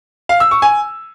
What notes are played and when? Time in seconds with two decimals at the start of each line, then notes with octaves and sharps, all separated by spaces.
0.29 F5
0.40 E6
0.51 C#6
0.62 G#5